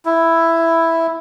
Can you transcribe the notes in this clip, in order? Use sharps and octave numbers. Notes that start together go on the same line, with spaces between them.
E4